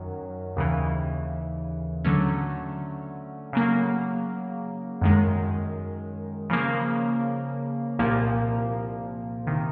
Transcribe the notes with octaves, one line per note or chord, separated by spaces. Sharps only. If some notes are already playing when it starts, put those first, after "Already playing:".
Already playing: F#2 D#3 F#3
D#2 C#3 E3
D3 F#3 A3 C#4
C#3 F#3 A#3
F#2 D#3 G#3
C#3 F3 A#3
C2 A#2 F3 A#3
C3 D#3